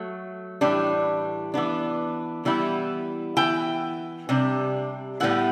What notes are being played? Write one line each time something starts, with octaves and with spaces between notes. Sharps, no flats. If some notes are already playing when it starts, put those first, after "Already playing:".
Already playing: F#3 A3
A2 E3 G3 D4
E3 B3 D4
E3 G3 B3 E4
E3 B3 E4 G5
C3 G3 D4
A2 G3 B3 E4 F#5